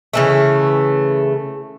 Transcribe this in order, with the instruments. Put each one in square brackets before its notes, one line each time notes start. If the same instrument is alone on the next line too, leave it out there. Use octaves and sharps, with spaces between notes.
[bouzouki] C#3 E3 A3